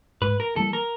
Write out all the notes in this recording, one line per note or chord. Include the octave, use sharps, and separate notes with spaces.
G#2 B4
A#4
E3 G3 A#3 A4
A#4